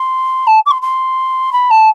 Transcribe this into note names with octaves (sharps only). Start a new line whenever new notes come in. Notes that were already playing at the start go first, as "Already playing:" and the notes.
Already playing: C6
A5
D6
C6
C6
B5
A5